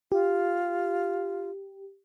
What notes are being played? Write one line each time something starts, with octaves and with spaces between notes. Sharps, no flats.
F4 G4